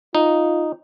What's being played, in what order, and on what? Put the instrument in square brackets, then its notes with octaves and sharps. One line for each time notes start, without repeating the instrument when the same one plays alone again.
[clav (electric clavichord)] D#4 [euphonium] F4